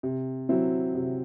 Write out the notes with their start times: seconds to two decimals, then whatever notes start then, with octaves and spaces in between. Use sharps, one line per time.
0.03 C3
0.49 F#3 C4 E4
0.95 C3